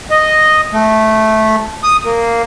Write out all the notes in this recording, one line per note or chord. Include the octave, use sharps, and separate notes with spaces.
D#5
A3
D#6
A#3